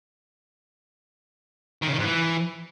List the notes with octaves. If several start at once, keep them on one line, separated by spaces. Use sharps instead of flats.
D#3
C#3
D#3
G#2
E3